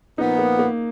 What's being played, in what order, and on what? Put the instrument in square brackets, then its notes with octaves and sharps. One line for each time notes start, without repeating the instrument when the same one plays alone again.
[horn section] A#2 F3 B3 [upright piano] D#4
[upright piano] A#3
A#3